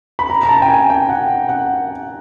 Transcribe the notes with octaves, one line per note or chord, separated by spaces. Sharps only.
B5
A#5
A#5
A5
G5
G#5
G5
F#5
F#5